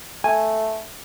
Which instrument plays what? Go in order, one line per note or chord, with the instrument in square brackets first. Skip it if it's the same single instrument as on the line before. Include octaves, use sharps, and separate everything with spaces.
[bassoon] A3 [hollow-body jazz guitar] G#5